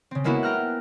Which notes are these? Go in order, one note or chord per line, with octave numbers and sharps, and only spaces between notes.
C#3 C4
G#3 A#3 B3 E4 F#4
G5 A#5 F6 F#6